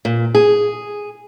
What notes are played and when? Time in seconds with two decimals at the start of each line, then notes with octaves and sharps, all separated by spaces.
0.05 A#2
0.35 G#4